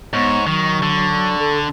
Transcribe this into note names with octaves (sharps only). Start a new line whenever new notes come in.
G#2 B3 C#5
D#3 F#3 C#6
D3
A4